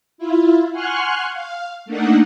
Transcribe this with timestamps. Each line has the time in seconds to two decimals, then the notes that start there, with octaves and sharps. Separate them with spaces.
0.18 E4 F4
0.71 F#5 G#5 C6 C#6 F6 F#6
1.33 F5
1.86 A3 A#3 D4 D#4 F#5